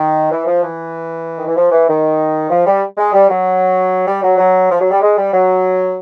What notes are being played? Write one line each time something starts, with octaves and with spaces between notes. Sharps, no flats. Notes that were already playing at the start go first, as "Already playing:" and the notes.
Already playing: D#3
E3
F3
E3
D#3
E3
F3
E3
D#3
F3
G3
G#3
G3
F#3
G3
F#3
F#3
F3
F#3
G3
G#3
G3
F#3